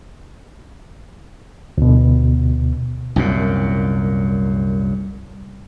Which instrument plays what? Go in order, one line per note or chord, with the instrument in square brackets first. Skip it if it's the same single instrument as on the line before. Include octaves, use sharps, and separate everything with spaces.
[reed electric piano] D2 B2
[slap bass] C2 F#2 A#2